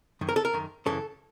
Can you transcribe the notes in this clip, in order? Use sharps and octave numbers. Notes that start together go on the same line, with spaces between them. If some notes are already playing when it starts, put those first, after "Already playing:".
F#2 D#3
A#4
A4
A#4
F#2 D#3
F#2 C#3 E3 A4